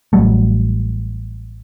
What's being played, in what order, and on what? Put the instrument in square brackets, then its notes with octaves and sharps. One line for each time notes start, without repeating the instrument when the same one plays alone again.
[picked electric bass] A1 F#3 G3 A3